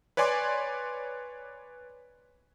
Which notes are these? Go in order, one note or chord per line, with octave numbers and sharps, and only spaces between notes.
B4 C#5 D5 G#5 C6 D6